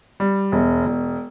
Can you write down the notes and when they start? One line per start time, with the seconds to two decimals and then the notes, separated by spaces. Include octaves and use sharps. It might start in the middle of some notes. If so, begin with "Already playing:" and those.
0.20 G3
0.52 E1
0.86 E1